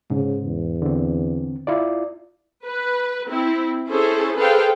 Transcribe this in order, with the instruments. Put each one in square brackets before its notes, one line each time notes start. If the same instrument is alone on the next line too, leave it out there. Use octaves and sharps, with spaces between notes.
[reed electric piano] G#2 [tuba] C#3
[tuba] E2
[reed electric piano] D3 C4
E4 F4 D5
[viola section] B4
C4 E4
C#4 E4 G#4 A4 C5
G#4 A4 B4 C5 F5 G5